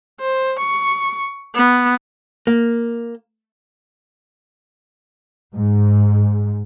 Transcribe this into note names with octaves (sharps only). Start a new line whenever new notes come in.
C5
C#6
B3
A#3
G#2